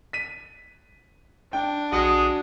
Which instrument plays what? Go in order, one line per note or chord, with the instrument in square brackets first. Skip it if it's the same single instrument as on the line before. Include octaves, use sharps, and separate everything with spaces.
[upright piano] B6 D#7
[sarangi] D4 [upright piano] G5
[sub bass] A#1 [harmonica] G#3 D#5 D#6 [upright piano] F#4